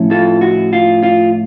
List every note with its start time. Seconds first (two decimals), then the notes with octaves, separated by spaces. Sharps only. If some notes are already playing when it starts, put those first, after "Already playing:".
Already playing: A2 F3 A3 C#4
0.11 F4 A4
0.41 F#4
0.73 F4
1.03 F4